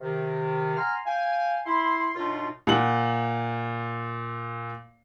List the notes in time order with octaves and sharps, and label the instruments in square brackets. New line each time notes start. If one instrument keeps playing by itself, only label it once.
[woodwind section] C3 D#3
F#5 G#5 A#5 C6 F6
F5 G5 G#5
E4 B5 C6
F#2 B2 D4 D#4 F4
[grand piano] A#2 F#5 F#7